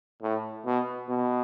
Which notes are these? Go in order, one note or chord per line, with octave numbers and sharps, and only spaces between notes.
A2
B2
B2